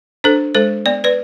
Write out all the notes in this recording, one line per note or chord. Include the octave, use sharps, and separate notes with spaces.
D4 A4 C5
G#3 A4 C5
B3 D5
B4 D5